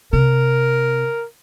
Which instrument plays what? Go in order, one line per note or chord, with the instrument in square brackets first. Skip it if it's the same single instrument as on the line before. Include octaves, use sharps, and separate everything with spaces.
[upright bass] C3 [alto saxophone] A#4